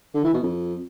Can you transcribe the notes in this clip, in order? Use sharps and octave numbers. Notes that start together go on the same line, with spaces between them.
D3
E3
B2
F2